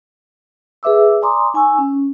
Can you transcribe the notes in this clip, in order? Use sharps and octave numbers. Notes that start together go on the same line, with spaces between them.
G#4 B4 E5 D6 E6
D5 G#5 A#5 C6 D6 D#6
D#4 G#5 C#6 E6
C#4